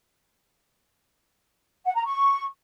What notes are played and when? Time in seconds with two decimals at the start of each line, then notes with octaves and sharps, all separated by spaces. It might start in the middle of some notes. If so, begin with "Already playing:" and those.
1.85 F#5
1.95 A#5
2.05 C#6